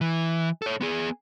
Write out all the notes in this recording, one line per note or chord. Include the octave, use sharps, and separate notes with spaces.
E3
A4 C#5
B3 G#4